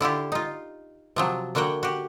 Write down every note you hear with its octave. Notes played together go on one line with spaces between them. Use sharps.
D3 E4 F4 G4
D#4 F4
C3 F3 F#3
D3 A#3 F#4 C#5 G5
F#4 G4